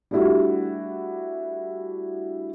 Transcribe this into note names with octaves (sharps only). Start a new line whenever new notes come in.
G3 A3 D4 E4 F#4